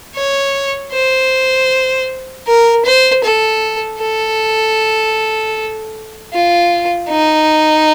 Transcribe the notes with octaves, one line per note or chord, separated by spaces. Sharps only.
C#5
C5
A#4
C5
A4
A4
F4
D#4